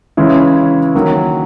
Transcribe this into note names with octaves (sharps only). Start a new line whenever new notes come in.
C#3 E3 G#3 C#4 E4
D#3 F#3 A#3